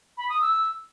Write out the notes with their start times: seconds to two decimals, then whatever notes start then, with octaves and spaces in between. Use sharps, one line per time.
0.17 B5
0.29 D#6
0.41 E6